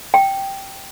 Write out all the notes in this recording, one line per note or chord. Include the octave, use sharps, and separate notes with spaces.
G5